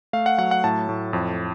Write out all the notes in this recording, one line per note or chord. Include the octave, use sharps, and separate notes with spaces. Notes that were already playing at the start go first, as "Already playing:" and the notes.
A3 F5
F#5
F#3 F#5
F#5
A2 A5
A2
F2